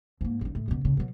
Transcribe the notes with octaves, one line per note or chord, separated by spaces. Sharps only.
G#2 A#3
A1 D#4
A2
F#1 B2
D#2 C#3
B2 F#3